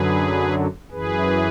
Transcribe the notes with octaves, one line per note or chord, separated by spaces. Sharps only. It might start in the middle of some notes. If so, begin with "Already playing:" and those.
Already playing: F#2 D3 F#3 G#4 B4
F#2 E3 G#4 B4